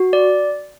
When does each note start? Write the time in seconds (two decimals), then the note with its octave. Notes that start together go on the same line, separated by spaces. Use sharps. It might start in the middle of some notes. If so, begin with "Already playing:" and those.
Already playing: F#4
0.13 D5